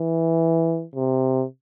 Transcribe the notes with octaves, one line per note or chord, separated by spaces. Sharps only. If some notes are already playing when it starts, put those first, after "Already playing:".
Already playing: E3
C3